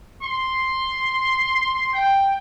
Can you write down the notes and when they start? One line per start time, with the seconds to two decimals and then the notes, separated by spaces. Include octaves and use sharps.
0.21 C6
1.94 G5